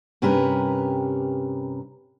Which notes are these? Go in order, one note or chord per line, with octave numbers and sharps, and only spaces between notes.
G2 C3 C#4 G4 A#4 B4